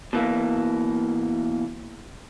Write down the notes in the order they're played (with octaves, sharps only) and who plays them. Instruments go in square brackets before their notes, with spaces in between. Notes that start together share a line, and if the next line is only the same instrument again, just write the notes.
[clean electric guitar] B2 E3 A#3